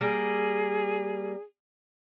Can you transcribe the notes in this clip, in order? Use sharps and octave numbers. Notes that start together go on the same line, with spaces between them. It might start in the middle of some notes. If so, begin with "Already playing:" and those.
G3 A#3 G#4